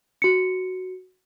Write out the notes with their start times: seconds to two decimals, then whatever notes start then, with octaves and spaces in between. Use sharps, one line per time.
0.22 F#4 C#7